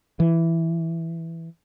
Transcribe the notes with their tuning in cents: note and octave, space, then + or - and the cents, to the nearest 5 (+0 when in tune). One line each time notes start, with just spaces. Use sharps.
E3 +5